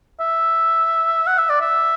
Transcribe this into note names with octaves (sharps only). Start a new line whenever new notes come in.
E5
F#5
E5
D5
E5